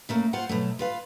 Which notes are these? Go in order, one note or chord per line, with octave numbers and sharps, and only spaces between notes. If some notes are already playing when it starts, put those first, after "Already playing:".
C#3 A3 A#3
F4 C5 F#5
B2 F#3 A3
F4 B4 F5